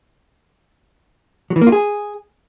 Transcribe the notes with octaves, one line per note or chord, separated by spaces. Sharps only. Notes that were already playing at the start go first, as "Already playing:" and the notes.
F#3
E3
A#3
F4
G#4